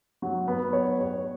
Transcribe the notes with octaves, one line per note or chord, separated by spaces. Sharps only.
F#3
B3
C#5
C#5